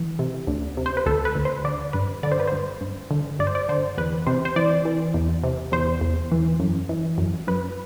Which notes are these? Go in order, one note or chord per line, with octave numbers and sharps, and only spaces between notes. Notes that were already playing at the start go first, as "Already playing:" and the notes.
Already playing: E3
C3
D2
C3
C5
B4
D2 A4
B4
D2
C5
D3 D5
G2 B4
D3 D5
C5
B4
G2 C5
G2
D3
G2 D5
C5
D5
D3 C5
E2 B4
C3 C5
C5
E3 D5
E3
E2
C3
E2 C5
E2
E3
F#2
E3
F#2
F#2 B4